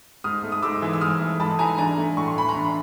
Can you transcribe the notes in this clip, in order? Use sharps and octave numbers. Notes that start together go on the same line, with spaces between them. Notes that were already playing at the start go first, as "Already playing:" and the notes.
G#2 D#6 F6
A3
D#6
G#2 D6 E6
E3
E6
G#2 D#6 F6
A3
G#2 A5 B5
E3 G#5 A#5
D4 G#5 A#5
A3
A2 C#6
C6
E3 B5
A#5 C6
D4